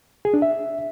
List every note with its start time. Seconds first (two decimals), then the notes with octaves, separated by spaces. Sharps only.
0.25 G#4
0.34 D4
0.42 E5